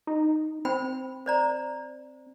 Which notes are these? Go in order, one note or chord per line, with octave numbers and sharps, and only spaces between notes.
D#4
C4 C5 G5 B5
C5 D5 A#5